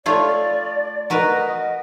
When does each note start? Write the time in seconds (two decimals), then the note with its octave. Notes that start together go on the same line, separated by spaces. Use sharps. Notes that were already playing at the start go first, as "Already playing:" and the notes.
0.06 A3 F4 C#5 D5
1.10 F#4 A#4 B4 D#5